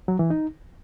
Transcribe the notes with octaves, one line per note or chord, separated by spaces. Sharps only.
F#3
E3
D#4